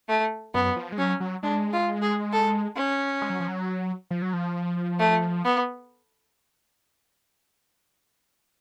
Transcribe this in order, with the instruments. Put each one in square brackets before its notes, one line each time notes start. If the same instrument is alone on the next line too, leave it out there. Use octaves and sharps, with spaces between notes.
[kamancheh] A3
[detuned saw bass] F#2 [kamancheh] B3
[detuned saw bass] F3
G#3
[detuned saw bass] F#3 [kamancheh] C#4
[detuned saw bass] F#3
[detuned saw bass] G#3 [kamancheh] D4
[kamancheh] F4
G#4
A4
C#4
[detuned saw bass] G#3
F#3
F3
F#3
F3
F#3
F3
[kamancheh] A3
B3